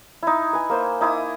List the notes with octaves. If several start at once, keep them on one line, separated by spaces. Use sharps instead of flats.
D#4 E4
B4 G#5
A#3 C5 E5
D#4 E4 D6 D#6